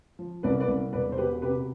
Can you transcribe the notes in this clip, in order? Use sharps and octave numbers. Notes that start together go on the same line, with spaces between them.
F3
C2 B4 D5
B4 D5
C2
E1 B4 D5
C5
B2 G4 B4
C3 G4 B4